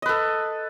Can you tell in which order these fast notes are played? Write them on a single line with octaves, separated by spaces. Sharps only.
D#5 B4 A4